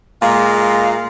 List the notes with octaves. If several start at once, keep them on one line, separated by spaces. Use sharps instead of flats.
A#2 G#3 F5